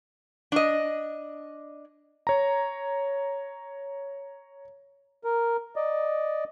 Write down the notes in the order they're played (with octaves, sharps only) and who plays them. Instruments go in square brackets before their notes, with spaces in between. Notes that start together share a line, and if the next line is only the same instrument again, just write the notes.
[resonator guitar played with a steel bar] D4 D#5
[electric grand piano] C#5 A#5
[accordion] A#4
D5 D#5